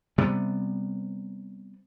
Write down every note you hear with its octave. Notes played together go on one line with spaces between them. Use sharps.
C3 G3 B3